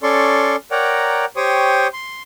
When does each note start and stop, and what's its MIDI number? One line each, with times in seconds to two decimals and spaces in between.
0.03 0.56 61
0.03 0.56 69
0.03 0.56 74
0.03 0.56 84
0.03 0.56 85
0.71 1.25 70
0.71 1.25 73
0.71 1.25 74
0.71 1.25 78
0.71 1.25 79
0.71 1.25 82
1.36 1.88 67
1.36 1.88 72
1.36 1.88 73
1.36 1.88 79
1.36 1.88 85
1.36 1.88 87
1.93 2.23 84